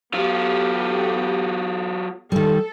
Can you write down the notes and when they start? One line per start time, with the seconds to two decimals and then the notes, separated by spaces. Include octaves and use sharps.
0.14 F#3 B3 F4 G4 A4
2.32 D#3 G3 A4